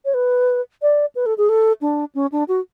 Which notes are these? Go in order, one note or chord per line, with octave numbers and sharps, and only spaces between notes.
C#5
B4
D5
B4
A4
G#4
A4
D4
C#4
D4
F#4